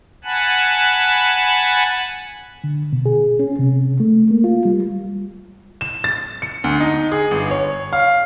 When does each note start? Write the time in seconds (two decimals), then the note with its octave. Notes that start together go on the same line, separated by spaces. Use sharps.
0.24 F#5 G#5 A5 B5 F#6
2.64 D3
2.93 B2
3.06 G#4
3.39 C#4
3.59 C3
4.00 A3
4.31 A#3
4.44 F4
4.65 G3
5.81 E7
6.04 A6
6.42 C#7
6.64 D2
6.80 D#4
7.12 G#4
7.31 G1
7.51 C#5
7.93 F5